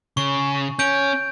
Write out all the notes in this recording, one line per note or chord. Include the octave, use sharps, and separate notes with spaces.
C#3 C#6
C#4 G6 D7